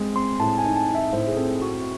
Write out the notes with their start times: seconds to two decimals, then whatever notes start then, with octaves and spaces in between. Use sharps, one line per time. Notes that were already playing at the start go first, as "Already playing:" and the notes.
Already playing: G#3 C4
0.15 C4 C6
0.40 A2 A5
0.58 G#5
0.64 D#4
0.76 A5
0.89 D#4
0.95 E5
1.12 A2 C5
1.27 G#4
1.37 C4 A4
1.62 C4 F#4